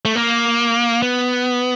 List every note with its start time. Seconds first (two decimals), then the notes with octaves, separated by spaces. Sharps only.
0.05 A3
0.16 A#3
1.02 B3